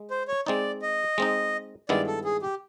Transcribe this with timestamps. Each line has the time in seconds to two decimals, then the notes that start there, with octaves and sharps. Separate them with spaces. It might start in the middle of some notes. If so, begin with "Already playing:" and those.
Already playing: G#3
0.11 C5
0.28 C#5
0.46 G#3 C4 D#4 D5
0.82 D#5
1.18 G#3 C4 D#4
1.89 G2 D#3 G#3 B3 E4 D5
2.07 A4
2.25 G#4
2.42 G4